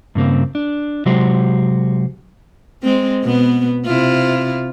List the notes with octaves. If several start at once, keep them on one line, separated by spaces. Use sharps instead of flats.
G2 C#3 A#3 C4
D4
C3 F#3 G#3 F#4 G4 C5
G#3 C4
B2 B3
C3 E4 F4